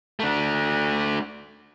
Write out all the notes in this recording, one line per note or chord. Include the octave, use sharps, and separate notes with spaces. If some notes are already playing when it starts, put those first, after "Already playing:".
A3 D4